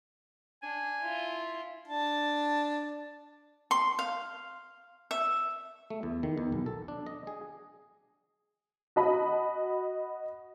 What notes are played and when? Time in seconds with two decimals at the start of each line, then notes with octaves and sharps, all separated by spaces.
0.63 D4 G#5
1.02 E4 F4
1.88 D4 A5
3.71 C6
3.99 F5
5.11 E5
5.90 A3
6.03 E2
6.23 D#3
6.38 E2
6.52 B1
6.66 A4
6.88 D4
7.06 D#5
7.27 G#4
8.96 F#4 D#5 B5